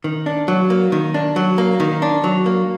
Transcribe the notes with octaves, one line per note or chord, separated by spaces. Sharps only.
D#3
D4
F#3
A#3
D#3
D4
F#3
A#3
D#3
D4
F#3
A#3